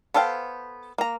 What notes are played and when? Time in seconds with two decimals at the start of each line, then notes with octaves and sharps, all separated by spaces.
0.14 B3 A4 C5 F5 G5
0.98 A#3 A#5